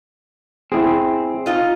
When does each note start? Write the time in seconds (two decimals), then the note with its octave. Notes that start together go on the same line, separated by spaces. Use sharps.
0.72 C4 E4 G#4
1.46 D#4 F4 D#5